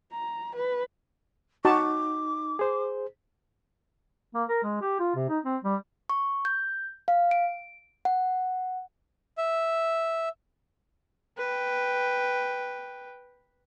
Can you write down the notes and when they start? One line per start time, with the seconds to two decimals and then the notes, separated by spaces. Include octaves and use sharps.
0.12 A#5
0.55 B4
1.65 D#4 F#4 A5 C#6 D6
2.59 G#4 C5
4.35 A#3
4.49 A#4
4.63 G#3
4.81 G4
5.00 F4
5.15 C3
5.29 D#4
5.45 C4
5.64 G3
6.10 C#6
6.45 G6
7.08 F5
7.31 D7
8.05 F#5
9.38 E5
11.38 B4 G5